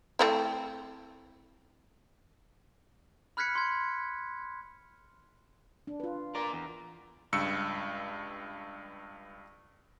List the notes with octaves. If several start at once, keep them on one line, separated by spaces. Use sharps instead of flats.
A3 C4 E4
B5 F6 F#6 G#6 B6 C#7
C6 G#6
D4
F4 B4
A#4 D5
E2
C#2 G2 E6 C#7